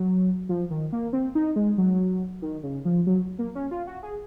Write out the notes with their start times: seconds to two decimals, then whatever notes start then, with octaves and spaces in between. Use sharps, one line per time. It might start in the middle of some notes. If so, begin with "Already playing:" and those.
Already playing: F#3
0.49 F3
0.70 D#3
0.92 A#3
1.13 C4
1.35 D#4
1.56 G#3
1.78 F#3
2.42 D#3
2.63 C#3
2.85 F3
3.07 F#3
3.39 A#3
3.55 C#4
3.71 F4
3.87 F#4
4.03 G#4